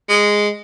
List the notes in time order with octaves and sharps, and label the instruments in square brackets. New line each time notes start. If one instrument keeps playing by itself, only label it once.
[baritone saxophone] G#3